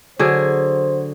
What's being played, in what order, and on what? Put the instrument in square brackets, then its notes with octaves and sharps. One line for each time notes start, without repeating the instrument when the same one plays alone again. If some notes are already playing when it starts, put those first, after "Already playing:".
[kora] D3 F#3 G#4 [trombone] C5